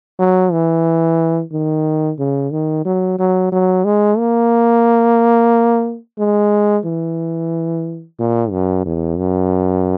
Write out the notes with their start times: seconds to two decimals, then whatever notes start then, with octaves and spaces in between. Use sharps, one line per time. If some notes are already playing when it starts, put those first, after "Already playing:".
0.19 F#3
0.52 E3
1.52 D#3
2.19 C#3
2.51 D#3
2.86 F#3
3.19 F#3
3.52 F#3
3.85 G#3
4.18 A#3
6.19 G#3
6.85 E3
8.19 A#2
8.51 F#2
8.86 E2
9.18 F#2